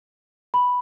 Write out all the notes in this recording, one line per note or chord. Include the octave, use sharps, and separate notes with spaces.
B5